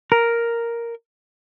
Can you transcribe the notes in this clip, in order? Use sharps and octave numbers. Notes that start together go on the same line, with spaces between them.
A#4